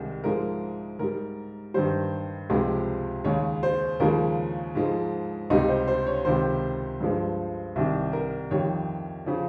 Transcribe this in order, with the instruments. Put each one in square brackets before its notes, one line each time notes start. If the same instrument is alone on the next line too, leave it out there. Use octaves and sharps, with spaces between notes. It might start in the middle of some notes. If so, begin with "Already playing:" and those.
Already playing: [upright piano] C2 C3 D#3 G#3
G#2 F3 G#3 A#4
G#2 G3 A#4
G2 D#3 G3 C5
C#2 C3 F3 G#3
D#2 C#3 G#3 C#5
C5
D#2 C#3 F3 G#3 A#4
G#2 F3 G#3
C#2 C3 G3 D#4
C5
C5
C#5
C#2 C3 D#3 C5
G2 F3 G#3
C2 C3 D#3
A#4
F2 D#3 G3 C#5
C#3 F3